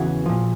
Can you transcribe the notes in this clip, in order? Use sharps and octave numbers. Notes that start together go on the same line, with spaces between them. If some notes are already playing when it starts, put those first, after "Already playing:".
Already playing: E2 C#3 E3 F#4 G#4
A#2 F3